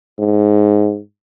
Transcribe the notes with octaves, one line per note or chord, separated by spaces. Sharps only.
G#2